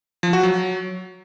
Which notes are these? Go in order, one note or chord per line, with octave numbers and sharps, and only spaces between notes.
F3
F#4
F#3